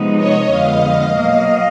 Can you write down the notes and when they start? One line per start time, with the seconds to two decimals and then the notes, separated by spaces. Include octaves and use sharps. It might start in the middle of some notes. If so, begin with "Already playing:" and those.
Already playing: C3 F3 G#3 B3 D#4
0.16 C#5 D#5
0.48 F2 D3 F3 G#3 B3 D#5 F5
1.14 B2 F#3 A#3 D#5 F5